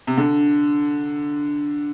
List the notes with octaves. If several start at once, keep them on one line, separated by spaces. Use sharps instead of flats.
C3
D3